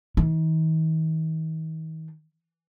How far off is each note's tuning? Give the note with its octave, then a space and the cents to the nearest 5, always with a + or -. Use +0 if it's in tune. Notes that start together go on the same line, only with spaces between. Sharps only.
D#3 +45